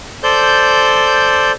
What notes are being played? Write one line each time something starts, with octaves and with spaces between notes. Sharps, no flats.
A4 C5 D5 G6